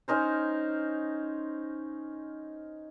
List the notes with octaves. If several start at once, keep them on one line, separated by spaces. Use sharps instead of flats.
C#4 D#4 A#4 C5